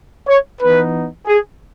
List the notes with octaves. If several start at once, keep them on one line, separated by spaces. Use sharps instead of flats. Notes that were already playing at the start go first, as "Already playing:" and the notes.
C#5
E3 B3 D#4 B4
G#4